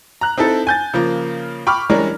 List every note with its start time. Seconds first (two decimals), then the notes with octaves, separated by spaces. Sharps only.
0.21 A#5 F#6
0.38 C4 D#4 E4 A4
0.67 G#5 G6 A6
0.94 C#3 F3 A#3
1.67 G5 B5 C#6 D6 F6
1.90 E3 G3 G#3 C#4 D4 A#4